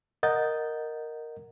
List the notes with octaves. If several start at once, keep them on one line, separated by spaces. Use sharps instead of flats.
A#4 D#5 F#5 G6 A6